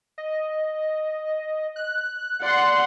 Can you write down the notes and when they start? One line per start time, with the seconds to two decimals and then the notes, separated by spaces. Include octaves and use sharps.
0.18 D#5
1.76 F#6
2.42 D5 F#5 C6